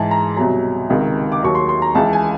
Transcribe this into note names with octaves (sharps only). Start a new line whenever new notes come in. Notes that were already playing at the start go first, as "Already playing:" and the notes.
Already playing: G#2 E3 A5
A#5
C2 B2 F#3 A#5
C#2 C3 D#3
D6
D#2 D#3 F#3 C#6
C6
C6
A#5
C#2 C#3 E3 A5
G#5